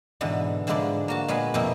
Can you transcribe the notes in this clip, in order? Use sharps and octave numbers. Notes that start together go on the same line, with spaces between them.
G#2 B2 D3 E3
G#2 D3 F3 G#3 E4 D5
A#3 F#4 A5
A#2 G#3 B3 C#5 G#5 B5
F2 B2 A#3 C4 E4 E5